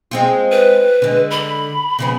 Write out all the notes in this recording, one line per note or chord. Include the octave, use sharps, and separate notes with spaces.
G#3 C4 F4
B4
D3 G#3
B5
C#3 F3 B3